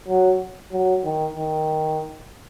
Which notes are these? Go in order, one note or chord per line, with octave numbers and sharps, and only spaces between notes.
F#3
F#3
D#3
D#3